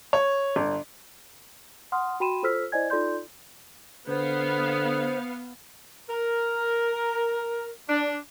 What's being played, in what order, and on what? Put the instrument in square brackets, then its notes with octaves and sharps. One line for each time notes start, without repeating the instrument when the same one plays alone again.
[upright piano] C#5
G1
[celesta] F#5 C6 D#6 F6
F#4 G5 B5 C6 D#7 E7
F4 A4 C5 E6 F6 B6
E4 C5 D5 D#5 G#5 G#6
D#4 F4 A4 D5 C6 G6
[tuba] D3 [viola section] B3 F5 [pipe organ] C5
[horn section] A#4
D4